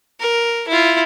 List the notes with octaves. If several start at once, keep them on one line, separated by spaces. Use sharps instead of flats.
A#4
E4 F4